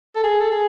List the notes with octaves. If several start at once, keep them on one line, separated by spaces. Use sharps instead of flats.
A4
G#4
A4
G#4